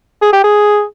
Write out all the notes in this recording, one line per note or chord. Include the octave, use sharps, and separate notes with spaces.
G#4
G4
G#4